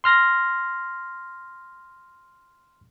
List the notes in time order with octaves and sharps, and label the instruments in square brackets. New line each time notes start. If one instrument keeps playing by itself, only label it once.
[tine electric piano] C6 F6 A#6